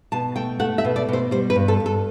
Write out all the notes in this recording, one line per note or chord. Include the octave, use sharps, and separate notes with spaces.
B2 A5
A3 G5
A3 F#5
E5
B2
D5
B2 C5
G3 C5
B4
G2
A4
G2
A4